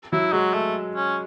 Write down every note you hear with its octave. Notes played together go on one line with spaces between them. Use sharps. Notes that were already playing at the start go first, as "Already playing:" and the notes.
F#3 E4
F#3 G#3
A3
C#4